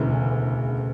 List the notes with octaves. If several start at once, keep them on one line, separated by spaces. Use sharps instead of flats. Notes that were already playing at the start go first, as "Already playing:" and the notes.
Already playing: E1 D2 C#3 E3